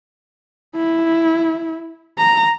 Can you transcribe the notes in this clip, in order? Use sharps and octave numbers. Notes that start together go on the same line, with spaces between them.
E4
A#5